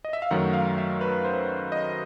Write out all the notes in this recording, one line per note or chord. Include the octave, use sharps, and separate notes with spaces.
D#5
E5
F5
F#2 D#3 F#3 A3 F#5
F5
E5
B4
C5
D#5